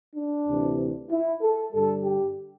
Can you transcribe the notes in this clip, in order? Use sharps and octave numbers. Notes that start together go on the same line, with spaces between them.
D4
D2 C3 E3
E4
A4
G2 D3 G3 A4
G4